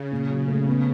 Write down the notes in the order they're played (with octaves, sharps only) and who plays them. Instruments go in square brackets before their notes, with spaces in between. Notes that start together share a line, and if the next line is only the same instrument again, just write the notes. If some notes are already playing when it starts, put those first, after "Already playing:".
Already playing: [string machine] C#3
[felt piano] A#2
F#3
A3
B3